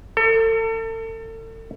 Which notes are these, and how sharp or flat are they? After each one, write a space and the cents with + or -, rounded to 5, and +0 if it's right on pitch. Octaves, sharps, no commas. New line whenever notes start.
A4 +40